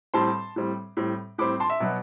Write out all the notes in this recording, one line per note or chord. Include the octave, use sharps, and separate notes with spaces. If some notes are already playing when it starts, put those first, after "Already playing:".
A2 G3 C4 A5 C6
A2 G3 C4
A2 G3 C4
A2 G3 C4 B5 D6
A5 C6
E5
B2 F#3 B3